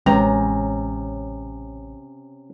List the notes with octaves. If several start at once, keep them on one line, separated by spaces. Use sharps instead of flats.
A1 C3 G#3 C#4 B4 G5 A#5